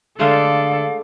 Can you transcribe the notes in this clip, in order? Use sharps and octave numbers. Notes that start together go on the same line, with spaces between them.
D3 G#3 A3 A4 D5 F5